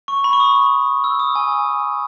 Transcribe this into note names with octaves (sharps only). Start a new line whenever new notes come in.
C#6
B5
C#6
D#6
E6
D#6
G#5